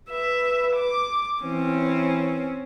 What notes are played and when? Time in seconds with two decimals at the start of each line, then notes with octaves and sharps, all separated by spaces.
0.10 B4 E5
0.76 D6
1.43 E3 C4 C#4